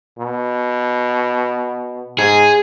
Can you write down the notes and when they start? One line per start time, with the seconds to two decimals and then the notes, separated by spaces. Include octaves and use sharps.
0.19 B2
2.18 G#2 G#4